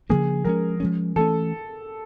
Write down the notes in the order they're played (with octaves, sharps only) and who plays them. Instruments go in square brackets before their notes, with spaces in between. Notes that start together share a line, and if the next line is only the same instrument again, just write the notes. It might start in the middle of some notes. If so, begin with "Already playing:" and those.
[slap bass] C#3 F3 A#3 D4 [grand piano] G#4
[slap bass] F3 G#3 C#4 [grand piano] A#4
[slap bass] F3 G#3 C#4
[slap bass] E3 A3 C#4 [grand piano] A4